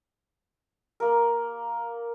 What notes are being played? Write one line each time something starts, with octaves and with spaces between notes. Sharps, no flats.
A#3 A#4